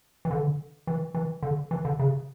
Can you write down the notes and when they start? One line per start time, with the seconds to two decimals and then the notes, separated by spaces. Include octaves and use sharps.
0.25 E3
0.31 D3
0.87 E3
1.15 E3
1.43 D3
1.71 E3
1.85 D3
2.00 C#3